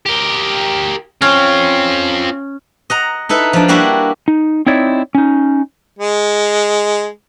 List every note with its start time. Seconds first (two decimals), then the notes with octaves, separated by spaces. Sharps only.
0.06 G4 A#4
1.22 C4 C#4 F4
2.90 D#5 F#5 A#5
3.29 D#4 E4 A4 B4
3.53 F3 D4
3.68 G3 A#3 D4 E4 F#4 G4
4.28 D#4
4.67 C4 D#4 E4 C#5 D5
5.15 C#4 D#4
5.99 G#3